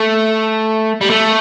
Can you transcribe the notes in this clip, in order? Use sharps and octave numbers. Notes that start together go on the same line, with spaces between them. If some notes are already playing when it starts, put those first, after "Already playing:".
Already playing: A3
G3
A3